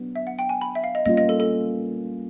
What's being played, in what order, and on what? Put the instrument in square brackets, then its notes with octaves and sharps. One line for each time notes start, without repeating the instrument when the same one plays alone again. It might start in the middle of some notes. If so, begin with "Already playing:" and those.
Already playing: [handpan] F#3 B3 D4
[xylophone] E5
F#5
G5
G#5
B5
E5
F5
D#5
[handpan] G3 A#3 C#4 F4 [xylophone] D#5
[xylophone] D#5
A4
A4